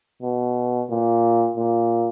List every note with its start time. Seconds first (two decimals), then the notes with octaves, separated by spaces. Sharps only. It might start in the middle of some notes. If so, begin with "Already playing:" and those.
0.22 B2
0.90 A#2
1.57 A#2